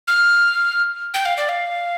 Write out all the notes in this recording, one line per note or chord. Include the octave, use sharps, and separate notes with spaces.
F6
G5
F5
D5
F5